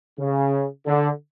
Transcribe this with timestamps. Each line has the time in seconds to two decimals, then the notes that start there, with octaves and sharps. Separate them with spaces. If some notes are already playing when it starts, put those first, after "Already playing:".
0.19 C#3
0.86 D3